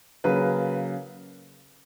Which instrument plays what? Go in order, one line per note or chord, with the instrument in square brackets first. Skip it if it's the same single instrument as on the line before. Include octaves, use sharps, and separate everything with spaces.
[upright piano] C#3 F#3 A#3 B4